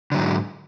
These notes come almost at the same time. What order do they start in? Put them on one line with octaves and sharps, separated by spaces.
D3 F#3 G#2